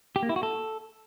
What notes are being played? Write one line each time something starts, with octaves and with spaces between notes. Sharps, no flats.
G4
A#3
E4
F#4
A4